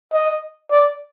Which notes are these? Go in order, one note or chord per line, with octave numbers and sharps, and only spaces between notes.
D#5
D5